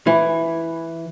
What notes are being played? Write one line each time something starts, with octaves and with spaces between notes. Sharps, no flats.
E3